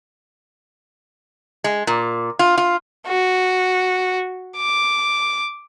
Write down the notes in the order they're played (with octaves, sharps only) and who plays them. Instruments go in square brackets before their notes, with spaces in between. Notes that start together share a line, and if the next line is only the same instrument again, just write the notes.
[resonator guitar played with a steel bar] G#3
A#2
F4
F4
[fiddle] F#4
D6